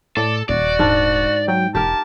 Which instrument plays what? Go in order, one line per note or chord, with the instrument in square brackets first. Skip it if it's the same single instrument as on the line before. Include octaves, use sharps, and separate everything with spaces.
[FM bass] A2 [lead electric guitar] A4 [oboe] D5
[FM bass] D#1 [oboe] F#4 [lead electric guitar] D5
[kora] G#2 D4
[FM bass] F#3 [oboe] G5
[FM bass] E1 [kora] G4 A#4 [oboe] A5